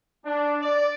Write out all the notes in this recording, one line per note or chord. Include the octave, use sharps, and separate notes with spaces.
D4
D5